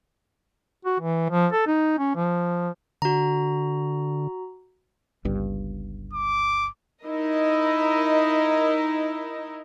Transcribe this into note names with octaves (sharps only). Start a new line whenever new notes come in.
F#4
E3
F3
A4
D#4
C#4
F3
D3 F#4 A#5
G1 C#2 G2
D6
D#4 E4 A#4 D#5